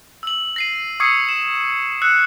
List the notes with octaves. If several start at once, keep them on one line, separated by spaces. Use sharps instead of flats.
E6 F#7
A#6 C7 D#7
C#6 D#6 E6 G#6 C7 C#7
E7
E6 F#6 C#7